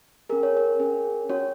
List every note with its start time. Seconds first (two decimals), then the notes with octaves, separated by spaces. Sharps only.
0.29 C#4 G#4 A#4
0.43 C#5
0.57 A#4
0.80 C#4 G#4
1.29 C#4 F#4 C#5